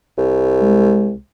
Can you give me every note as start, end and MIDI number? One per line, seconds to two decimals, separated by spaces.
0.18 1.17 36
0.62 1.14 56